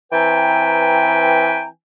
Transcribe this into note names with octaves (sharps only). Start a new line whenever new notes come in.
E3 C4 B4 G5 G#5 A#5